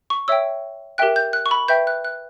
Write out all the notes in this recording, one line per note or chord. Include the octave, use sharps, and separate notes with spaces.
C#6
C#5 E5 G5 E6
G4 A#4 E5 G5 F#6
G6
F#6
C#6
B5
B4 E5 G5 G6
F#6
F#6